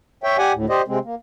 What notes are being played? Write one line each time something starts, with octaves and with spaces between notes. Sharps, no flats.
C#5 E5 G5
G4 D5 F#5 G#5
D2 A2
G4 C5 D5 D#5
C3 G#3 C4
A#3